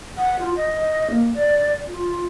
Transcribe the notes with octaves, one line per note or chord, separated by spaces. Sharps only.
F#5
F4
D#5
A#3
D5
F4